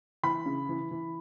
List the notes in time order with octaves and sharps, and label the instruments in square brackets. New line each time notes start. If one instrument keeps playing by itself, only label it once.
[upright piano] E3 B5
C#3
E3
E3